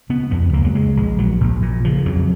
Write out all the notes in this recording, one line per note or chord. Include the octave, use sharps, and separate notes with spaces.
C#3 B3
F2 B3
C#2 A#3
F#3
C#3 G#3
A#1 G#3
A#2 F#3
A#1
A#2
C#3 F3
F2 F#3